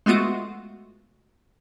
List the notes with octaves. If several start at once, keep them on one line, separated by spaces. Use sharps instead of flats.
G#3 A3 B3 F4 F#4